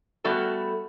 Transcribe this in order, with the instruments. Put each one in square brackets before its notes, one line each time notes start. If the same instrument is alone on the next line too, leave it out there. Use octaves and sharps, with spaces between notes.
[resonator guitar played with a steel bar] G3 A3 B3 F#4 A4